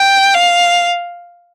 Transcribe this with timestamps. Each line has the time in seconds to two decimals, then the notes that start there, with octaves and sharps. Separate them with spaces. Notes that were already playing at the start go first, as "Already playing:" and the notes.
Already playing: G5
0.34 F5